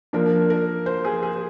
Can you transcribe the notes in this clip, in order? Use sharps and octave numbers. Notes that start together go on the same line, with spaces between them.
F3 A#3 D4 A#4
A#4
C5
G#4
G#4